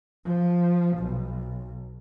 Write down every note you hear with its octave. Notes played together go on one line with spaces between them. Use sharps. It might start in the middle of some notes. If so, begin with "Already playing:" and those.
F3
B1